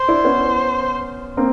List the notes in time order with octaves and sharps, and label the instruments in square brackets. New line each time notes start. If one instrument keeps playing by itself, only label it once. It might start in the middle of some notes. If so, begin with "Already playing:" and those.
Already playing: [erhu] C5
[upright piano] D4 E4
B3 C#4
A#3 C4